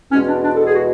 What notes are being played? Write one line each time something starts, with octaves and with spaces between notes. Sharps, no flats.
E2 B2 G#3 C#4
D4
D4
A4
G#4
F#4